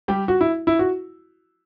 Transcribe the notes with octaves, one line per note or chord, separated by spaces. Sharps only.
G3 G4
F#4
E4
E4
F#4